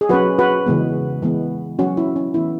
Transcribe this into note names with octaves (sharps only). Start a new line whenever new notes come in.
G#4
F#3 C#4 F#4 B4
F#4 B4
C#3 E3 G#3 B3
E3 G#3 B3
F#3 C#4 F#4
E4
C#4
E3 B3 E4